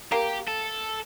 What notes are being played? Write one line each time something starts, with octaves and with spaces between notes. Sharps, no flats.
A#3 G4
A4